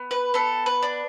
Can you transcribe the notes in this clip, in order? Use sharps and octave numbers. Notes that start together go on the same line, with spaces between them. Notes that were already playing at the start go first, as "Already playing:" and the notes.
Already playing: B3
B4
B3 A4
B4
D4